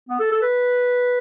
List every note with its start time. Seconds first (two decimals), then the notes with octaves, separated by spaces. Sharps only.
0.09 B3
0.20 A4
0.31 A4
0.42 B4